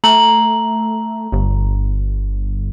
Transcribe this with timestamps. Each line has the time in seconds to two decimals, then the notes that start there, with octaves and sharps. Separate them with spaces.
0.04 A3 A#5 F#7
1.32 G1